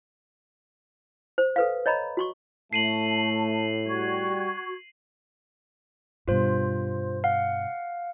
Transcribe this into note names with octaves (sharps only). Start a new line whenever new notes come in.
C5
A4 B4 F5
C#5 D#5 A#5 B5
F#4 C6 C#6
A2 A3 A5 C7 D#7 F#7
G3 F#4 C#6 G#6
G2 B2 F4 C5
F5 F#5